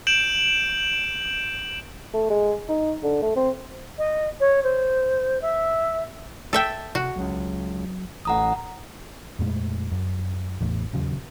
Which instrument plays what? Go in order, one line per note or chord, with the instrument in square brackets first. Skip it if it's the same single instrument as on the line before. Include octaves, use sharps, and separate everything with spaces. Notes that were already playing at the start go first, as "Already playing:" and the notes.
[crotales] G6 D7 E7 F#7
[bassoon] A3
G#3
D#4
D3
A3
C4
[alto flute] D#5
C#5
C5
E5
[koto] A4 E5 G5
[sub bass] C3 [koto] F#4
[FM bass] C#2 [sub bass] F#3
[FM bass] A1 [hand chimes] F#5 A#5 D#6
[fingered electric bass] F2 A#2 G#3 A3
F#2
A1 E2 A2
D#1 E2 C#3 F#3